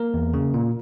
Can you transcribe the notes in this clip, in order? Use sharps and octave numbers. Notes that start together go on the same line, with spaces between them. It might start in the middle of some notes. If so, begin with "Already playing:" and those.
Already playing: A#3 A#4
E2
C#3
A#2